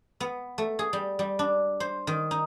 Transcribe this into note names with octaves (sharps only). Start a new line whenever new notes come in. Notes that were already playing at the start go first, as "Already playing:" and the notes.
B3
A3
G#4
G3
G3
D4
C5
D#3
D#4